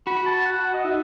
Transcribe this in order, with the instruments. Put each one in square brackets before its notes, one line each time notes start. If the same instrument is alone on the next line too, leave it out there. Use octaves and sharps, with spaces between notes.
[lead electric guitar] F#4 [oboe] B5
[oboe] A5
F#5
D#5
[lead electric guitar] D#4 [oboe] E5